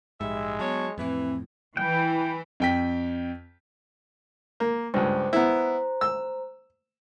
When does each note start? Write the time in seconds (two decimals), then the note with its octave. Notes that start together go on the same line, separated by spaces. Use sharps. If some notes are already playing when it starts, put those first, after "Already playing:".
0.21 A#1 G#2 G3 G#3 E5
0.59 F#3 B3 D4 C#5
0.98 F2 A2 E3 C4
1.77 E3 G5
2.60 F2 G5 B6
4.60 A#3
4.94 C#2 G2 C5
5.33 B3 E4 C5 A#5
6.01 E6